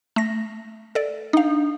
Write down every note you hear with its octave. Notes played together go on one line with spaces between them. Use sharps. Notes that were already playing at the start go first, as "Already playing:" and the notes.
A3 A#6
A4 D5
D4 D#4 F5